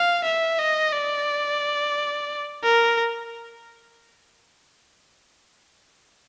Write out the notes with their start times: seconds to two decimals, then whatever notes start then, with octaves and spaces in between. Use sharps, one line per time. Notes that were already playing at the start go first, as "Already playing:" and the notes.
Already playing: F5
0.24 E5
0.59 D#5
0.93 D5
2.64 A#4